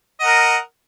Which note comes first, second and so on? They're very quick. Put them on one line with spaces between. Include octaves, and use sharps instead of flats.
D#5 F#5 A#4